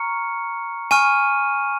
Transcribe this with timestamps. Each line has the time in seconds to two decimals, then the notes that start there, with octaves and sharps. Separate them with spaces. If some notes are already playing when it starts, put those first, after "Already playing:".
Already playing: A#5 C#6 F6 C#7
0.91 G#5 C#6 F6 D#7